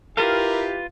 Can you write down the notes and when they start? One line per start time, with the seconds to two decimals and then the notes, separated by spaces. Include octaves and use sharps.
0.17 E4 F4 G4 A#4 B4 F5